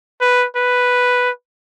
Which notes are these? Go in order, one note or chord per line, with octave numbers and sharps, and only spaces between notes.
B4
B4